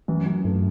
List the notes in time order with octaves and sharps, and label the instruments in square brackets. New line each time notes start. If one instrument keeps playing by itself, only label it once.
[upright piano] F#2 [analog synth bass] E3
[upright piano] F#2
[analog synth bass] G2 [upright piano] A3